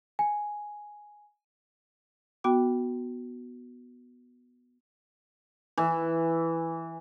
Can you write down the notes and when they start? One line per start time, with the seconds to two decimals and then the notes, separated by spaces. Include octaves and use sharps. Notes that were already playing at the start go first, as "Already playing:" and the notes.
0.19 G#5
2.44 B3 F#4 G5 D6
5.78 E3